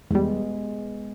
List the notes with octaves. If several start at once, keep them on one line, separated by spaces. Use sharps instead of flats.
E2 G3 G#3 B3